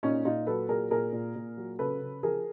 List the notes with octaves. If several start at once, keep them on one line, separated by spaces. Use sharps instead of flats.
A#2 C#4 D#4
A#2 D#4 F4
F#3 A4 B4
A#2 G#4 A#4
A#2 G#4 A#4
A#2
A#2
F#3
C#3 A4 B4
C#3
F3 G#4 A#4